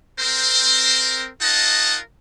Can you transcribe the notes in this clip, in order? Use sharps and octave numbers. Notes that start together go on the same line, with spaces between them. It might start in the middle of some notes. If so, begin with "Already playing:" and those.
C4 A#4 C5
D#4 F4 A#4 D#5 F#5 A5